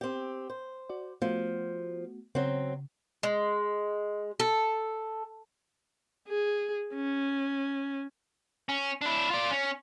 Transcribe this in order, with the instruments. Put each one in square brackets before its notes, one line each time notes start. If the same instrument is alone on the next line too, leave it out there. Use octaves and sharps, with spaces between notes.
[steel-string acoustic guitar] C4 G4
C5
[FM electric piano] F#4 D5
[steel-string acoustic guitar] F3 [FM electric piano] A3 B3 F#4
[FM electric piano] C#3 [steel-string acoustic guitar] F#3 C4
[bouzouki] G#3
A4
[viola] G#4
C#4
[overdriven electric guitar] C#4
D4 E4
F4 D5
C#4